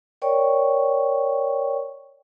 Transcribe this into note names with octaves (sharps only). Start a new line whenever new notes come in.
A#4 C#5 D5 G5 C#6